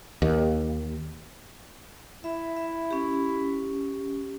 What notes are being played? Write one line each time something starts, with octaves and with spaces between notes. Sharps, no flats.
D#2
E4 E5
E5
C#4 G4